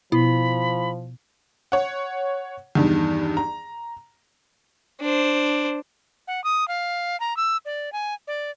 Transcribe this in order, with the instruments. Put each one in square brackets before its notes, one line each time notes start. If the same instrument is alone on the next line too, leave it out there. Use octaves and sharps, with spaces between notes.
[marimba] B2 B3 [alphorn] F3 [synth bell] E4 [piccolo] B5
[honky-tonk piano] C#5 F#5
E2 G2 D#3
A#5
[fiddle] D4 C5
[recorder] F#5
D#6
F5
A#5
E6
D5
G#5
D5